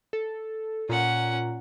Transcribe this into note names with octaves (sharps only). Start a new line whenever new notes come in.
A4
A#2 C#4 F4 F#5 A#5